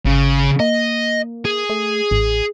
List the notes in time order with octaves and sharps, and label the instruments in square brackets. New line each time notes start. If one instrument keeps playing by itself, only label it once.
[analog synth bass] G#1 [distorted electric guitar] C#3
[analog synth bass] A#3 [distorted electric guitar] D#5
[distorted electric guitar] G#4
[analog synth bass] A3
A1